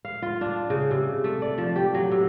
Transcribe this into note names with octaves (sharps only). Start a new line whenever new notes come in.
F5
F4
D4
C#3
C3
A3
D5
F3
G4
F#3
C3